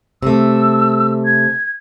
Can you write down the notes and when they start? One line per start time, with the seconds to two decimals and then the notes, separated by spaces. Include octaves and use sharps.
0.22 C3 A3 E6
1.25 G#6